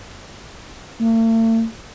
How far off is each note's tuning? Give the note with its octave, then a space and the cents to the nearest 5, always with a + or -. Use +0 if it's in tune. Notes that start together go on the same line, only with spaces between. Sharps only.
A3 +45